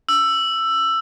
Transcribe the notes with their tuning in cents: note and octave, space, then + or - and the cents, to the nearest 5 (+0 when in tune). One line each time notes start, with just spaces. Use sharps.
E6 +10